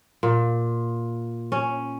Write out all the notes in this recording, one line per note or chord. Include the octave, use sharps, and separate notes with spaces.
A#2
C#4